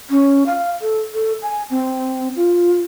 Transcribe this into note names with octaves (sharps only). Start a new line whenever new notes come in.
C#4
F5
A4
A4
G#5
C4
F4